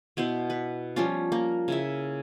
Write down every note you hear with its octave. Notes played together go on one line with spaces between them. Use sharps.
B2 B3 E4 C5
B4
F3 G3 C#4 F4
A#3 A#4
C#3 E4 E5